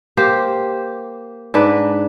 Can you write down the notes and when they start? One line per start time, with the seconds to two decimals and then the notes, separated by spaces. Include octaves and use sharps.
0.17 A#3 G4 C5
1.54 G#2 D4 B4